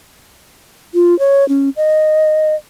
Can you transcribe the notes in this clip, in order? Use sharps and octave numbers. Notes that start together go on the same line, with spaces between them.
F4
C#5
C#4
D#5